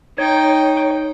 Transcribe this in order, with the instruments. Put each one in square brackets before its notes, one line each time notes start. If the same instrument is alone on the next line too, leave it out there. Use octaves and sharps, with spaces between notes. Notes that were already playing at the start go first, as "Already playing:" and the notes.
[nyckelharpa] D#4 G5 [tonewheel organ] C#5